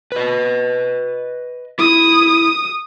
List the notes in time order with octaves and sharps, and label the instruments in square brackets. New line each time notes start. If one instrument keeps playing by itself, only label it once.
[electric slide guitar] B4 D#5
[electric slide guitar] E4 [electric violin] D#6